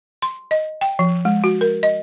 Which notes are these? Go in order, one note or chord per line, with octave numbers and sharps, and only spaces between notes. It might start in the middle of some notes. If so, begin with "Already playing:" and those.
C6
D#5
G5
F3
G#3
F#4
A#4
D#5